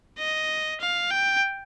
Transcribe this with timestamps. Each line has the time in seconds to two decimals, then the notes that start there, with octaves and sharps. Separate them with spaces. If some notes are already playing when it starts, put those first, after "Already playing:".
0.18 D#5
0.81 F5
1.11 G5